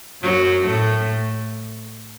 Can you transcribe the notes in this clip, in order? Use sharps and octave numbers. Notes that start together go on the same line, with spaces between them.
F#2 F#3
A2 A3